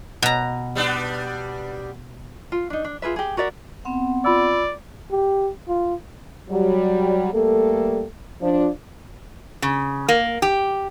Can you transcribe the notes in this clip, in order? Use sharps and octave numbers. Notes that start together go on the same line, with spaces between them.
B2 A#5
G3 B3 D4
F4
D4 D#4
D4
F4 G#4 B4 E5
G4 G#4
F#4 A#4 D5 E5
B3 C4 F#5
F4 D5 B5 E6
G4
F4
F#3 G3
G3 A3 A#3 A4
F3 D4
C#3
A#3
G4